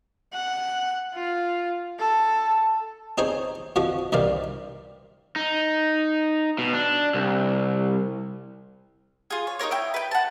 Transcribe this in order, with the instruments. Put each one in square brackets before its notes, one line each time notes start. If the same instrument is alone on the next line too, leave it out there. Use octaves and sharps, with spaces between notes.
[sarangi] F#5
F4
A4
[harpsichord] C4 D#4 G#4 C5 C#5
F2 F3 F#4 D#5
C2 G2 D#3 C4 D5 F5
[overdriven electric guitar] D#4
B2
D4
C2
[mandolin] F4 G#4
C#5
D#4 E4 A#4 C#5
E4 G5
B4 G5
F#5 A5